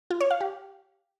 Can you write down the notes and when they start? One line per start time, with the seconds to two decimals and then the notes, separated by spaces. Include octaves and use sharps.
0.10 F4
0.21 C#5
0.31 F5
0.41 G4